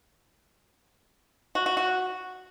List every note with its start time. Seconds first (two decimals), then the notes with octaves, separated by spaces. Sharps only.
1.55 F#4
1.66 F#4
1.77 F#4